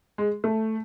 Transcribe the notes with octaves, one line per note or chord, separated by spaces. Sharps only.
G#3
A3